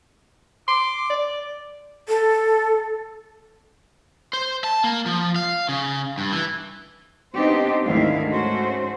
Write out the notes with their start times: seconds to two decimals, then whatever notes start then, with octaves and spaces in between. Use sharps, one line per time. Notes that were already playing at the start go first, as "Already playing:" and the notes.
0.68 C6 D6
1.10 D5
2.08 A4
4.33 C5
4.64 A5
4.84 A#3
5.06 F3
5.36 F5
5.69 C#3
6.18 G2
6.32 E3
7.35 B3 C4 D4 D#4 G4 C5
7.83 D2 G#2 D3 D#3 E4 F5
8.29 G#2 A3 C#4 F#4 C5